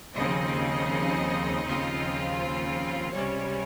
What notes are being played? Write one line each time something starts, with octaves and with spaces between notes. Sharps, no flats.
D#2 C#3 F3 C4 D#4 D#5
D#2 C#3 F3 C4 F4
C#2 C3 G3 C#4 C#5